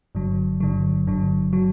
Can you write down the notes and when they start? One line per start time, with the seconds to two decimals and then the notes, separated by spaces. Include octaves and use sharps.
0.15 G1 G2 D3 F#3
0.60 G1 G2 D3 F#3
1.07 G1 G2 D3 F#3
1.53 D3 F#3